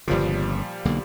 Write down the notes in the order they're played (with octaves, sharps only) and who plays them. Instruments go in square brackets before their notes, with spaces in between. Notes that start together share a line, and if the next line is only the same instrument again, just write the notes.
[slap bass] G1 C#3 [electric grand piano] A#2 F3 G3
[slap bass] B1 D3 A#3